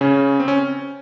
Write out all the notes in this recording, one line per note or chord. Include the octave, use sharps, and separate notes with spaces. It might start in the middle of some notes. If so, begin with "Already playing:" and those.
C#3 C#4
C4
C#4